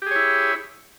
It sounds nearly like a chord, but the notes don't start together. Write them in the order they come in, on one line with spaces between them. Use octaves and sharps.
G4 G#4 C#5 E4